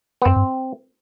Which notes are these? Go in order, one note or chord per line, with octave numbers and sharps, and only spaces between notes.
B3
F#2 C4
G2